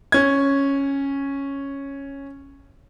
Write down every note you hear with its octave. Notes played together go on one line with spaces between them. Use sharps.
C#4 G#6